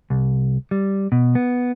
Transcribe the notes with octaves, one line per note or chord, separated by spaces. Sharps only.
C2
G3
B2
B3